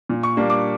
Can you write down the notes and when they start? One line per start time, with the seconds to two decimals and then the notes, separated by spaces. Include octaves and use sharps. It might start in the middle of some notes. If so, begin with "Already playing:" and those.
0.09 A#2
0.23 C#6
0.37 G3 A#3 D4
0.50 D6